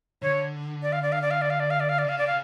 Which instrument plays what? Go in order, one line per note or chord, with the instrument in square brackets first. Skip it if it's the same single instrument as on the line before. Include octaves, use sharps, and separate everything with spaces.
[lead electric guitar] D3 [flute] C#5
[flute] D5
F5
D5
F5
D5
F5
D5
F5
D5
F5
D5
F5
D5
[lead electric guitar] C#3 [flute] F5
[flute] D5
F5